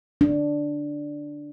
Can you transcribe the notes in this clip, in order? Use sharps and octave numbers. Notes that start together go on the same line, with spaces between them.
D4